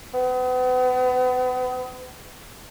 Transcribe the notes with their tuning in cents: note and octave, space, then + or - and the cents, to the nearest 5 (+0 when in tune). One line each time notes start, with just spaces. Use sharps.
B3 +40